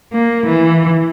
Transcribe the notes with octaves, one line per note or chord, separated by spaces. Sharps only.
A#3
E3